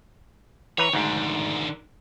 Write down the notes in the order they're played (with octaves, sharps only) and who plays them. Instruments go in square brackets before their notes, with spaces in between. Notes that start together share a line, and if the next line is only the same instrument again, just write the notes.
[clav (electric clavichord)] E3 B4 A#5 [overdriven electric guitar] C#5
[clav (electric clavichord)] D2 G#2 [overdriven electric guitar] D#3 D4